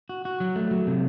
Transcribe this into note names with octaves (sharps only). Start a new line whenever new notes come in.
F#4
F#4
F#3
A3
F#3
C3